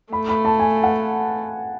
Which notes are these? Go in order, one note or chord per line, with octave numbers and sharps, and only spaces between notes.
A3 B5
B5
A5
G#5
F#5